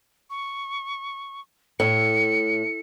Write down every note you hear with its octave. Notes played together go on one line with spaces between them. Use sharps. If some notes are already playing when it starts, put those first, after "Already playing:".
C#6
A2 C#7